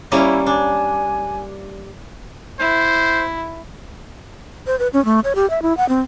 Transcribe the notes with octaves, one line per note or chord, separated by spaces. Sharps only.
G3 A#3 C#4 E4
D4 G#5
E4 C5
C5
B4
C#4
A3
C#5
G4
E5
E4
F#5
C4